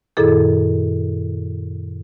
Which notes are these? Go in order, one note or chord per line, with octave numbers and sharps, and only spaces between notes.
F#2 A#2 D#3 E4 G#4 A4